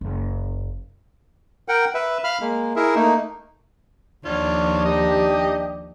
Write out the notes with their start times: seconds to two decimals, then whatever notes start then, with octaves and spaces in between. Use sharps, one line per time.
0.01 F#1
1.68 A#4 F#5 G5
1.95 B4 E5
2.24 F5 B5 F6
2.41 G#3 A#3
2.76 E4 G#4 A#4 E5
2.95 A3 A#3 D#4
4.26 D#2 F3 D4 F4 C#5
4.85 D#4 G4 D#5